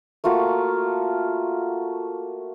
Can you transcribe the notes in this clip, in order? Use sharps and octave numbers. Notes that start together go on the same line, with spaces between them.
A3 A#3 F4 F#4